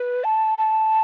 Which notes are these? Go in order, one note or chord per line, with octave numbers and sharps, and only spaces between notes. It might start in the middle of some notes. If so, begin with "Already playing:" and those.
Already playing: B4
A5
A5